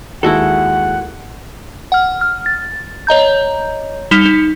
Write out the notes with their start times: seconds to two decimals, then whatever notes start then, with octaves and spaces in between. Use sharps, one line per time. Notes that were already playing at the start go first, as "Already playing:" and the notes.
0.23 D#2 G#3 E4 F#4 A4 F#5
1.92 F#5 F6
2.21 F6
2.46 A6
3.07 C#5 D#5 A#5 G6
4.11 G3 D#4 B6 E7 F7 G7
4.25 D#4